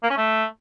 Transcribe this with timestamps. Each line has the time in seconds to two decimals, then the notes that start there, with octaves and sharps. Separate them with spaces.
0.03 A#3
0.10 C#4
0.17 A3